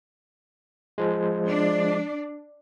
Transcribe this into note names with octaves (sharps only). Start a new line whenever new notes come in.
F3 G#3
D4